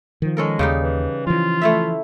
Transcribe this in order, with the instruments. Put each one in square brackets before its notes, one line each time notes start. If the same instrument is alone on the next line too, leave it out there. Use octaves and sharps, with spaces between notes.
[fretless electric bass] D#3 F3
[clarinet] G#3 [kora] C#4 A4 A#4
[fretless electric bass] D#2 [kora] C#3 G3 D#4
[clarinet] E3
[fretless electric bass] E3 F3 [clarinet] F4
[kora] A3 E4 E5